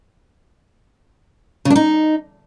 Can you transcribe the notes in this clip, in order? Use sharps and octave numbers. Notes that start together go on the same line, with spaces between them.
C#3
D4
D#4